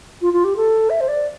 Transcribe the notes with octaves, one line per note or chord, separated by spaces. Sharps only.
F4
F4
G4
A4
E5
C5
D5